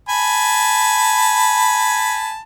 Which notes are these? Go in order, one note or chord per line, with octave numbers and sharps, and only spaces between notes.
G#5 A5 B5